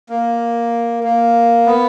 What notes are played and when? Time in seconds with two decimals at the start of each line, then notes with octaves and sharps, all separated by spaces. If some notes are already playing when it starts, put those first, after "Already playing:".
0.09 A#3
1.04 A#3
1.66 B3